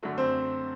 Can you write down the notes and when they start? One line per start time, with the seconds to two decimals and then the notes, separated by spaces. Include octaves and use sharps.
0.03 F#2 D3 F#3 A3
0.18 C4 C5